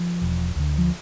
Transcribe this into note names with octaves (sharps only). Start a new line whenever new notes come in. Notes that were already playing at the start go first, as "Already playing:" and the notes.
Already playing: F3
E1
D2 D3
F3